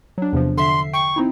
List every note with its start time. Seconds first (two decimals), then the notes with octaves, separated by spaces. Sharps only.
0.18 F#3 D4
0.33 E2 C3 F3
0.57 D3 E5 C6 C7
0.93 G5 C#6
1.16 C4 D#4 E4